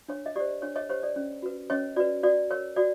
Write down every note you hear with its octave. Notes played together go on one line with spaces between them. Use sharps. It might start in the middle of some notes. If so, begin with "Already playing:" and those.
D4 C#5
D#5
G4 C5 D5
D4 C#5
C#5 D#5
G4 C5 C#5
D5
C#4
F#4 B4
C#4 C#5 D#5
F#4 B4 D5
F#4 D5
A#4 C#5
F#4 D5